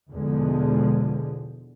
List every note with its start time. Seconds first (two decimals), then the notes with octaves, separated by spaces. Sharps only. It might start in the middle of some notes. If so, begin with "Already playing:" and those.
0.11 E2 B2 D3 F3 G#3